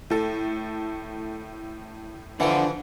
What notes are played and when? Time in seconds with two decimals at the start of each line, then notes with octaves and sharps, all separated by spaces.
0.10 A2 A4
2.40 D3 E3 F3 D4 F#5 G5